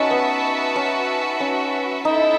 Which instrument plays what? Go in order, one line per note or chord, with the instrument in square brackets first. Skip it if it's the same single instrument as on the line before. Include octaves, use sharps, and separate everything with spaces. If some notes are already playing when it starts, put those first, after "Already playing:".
Already playing: [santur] C#4 D#4 [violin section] F#4 B4 E5 A5
[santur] B3
C#4
C#4
[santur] D#4 [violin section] E4 A4 E5